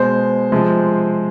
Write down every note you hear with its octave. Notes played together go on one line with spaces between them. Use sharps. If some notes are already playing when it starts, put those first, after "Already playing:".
Already playing: B2 G#3 C5
C3 F3 G#3